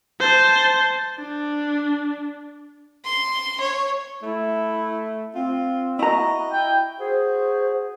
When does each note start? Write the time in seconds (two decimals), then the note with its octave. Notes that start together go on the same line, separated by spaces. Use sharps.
0.20 C5 A5
1.19 D4
3.04 C6
3.60 C#5
4.23 A3 E4
5.35 C4 F4
5.99 E4 F#4 D#5 A#5
6.53 E4 G5
7.00 F#4 G#4 C5